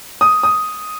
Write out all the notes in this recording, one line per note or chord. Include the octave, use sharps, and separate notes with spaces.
D#6
D#6